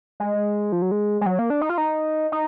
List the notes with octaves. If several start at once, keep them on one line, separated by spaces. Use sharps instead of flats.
G#3
F3
F#3
G#3
G#3
F#3
A#3
D4
D#4
F4
D#4
D#4